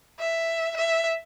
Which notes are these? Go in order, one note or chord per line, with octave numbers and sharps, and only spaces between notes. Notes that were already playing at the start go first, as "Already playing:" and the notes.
E5
E5